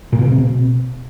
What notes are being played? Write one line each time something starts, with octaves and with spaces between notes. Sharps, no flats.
A#2
B2
C#3
C4
B2